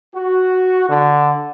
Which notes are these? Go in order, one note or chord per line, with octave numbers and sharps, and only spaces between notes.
F#4
D3